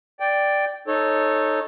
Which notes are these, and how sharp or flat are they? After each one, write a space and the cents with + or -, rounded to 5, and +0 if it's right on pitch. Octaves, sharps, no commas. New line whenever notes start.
D5 +0 G5 +0
D#4 -5 A4 +0 C#5 -20